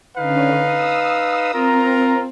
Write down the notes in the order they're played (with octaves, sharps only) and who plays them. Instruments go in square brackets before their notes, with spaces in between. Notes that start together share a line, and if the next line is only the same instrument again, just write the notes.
[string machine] D3 C#4 [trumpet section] D#4 B4 F5
[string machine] D#6 E6
[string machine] C4 [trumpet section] F4 A#4 A#5